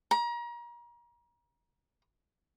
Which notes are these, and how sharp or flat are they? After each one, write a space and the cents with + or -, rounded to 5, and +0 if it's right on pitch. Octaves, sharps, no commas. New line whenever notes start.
A#5 +35